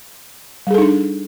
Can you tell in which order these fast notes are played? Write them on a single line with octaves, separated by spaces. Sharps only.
G3 G#4 A4 D#4 D4